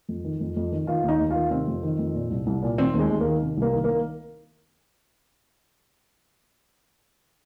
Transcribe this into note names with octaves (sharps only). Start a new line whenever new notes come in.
F2
D#3
F2
F2
D#3
D#3 F4
D#2
D#4
D#2
F4
D#3
C3 C4
F2
D#3
F2
A#2
C2
C2
A#2
D#3 C4
D#2
G#3
D#2
D#3 A#3
C3
C2
A#3
D#3
A#3